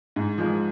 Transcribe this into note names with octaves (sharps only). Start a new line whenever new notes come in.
G#2
F3 G#3